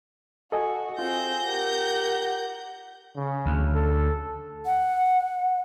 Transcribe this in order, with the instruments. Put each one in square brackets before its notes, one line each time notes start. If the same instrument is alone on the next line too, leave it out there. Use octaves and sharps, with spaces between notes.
[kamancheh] F#4 [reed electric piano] A4 D#5 G#5
[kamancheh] C4 G#4 [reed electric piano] F4 [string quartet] G6 A#6
[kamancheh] G4 A#4 [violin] F#5
[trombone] C#3
[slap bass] D2
[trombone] A4
[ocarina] F#5